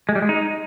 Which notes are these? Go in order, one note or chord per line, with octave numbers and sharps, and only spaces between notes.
G#3
G3
G#3
D#4